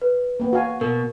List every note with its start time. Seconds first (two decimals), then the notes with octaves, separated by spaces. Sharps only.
0.02 B4
0.40 A#3 B3
0.53 F#4 F5 G#5
0.81 B2 A#4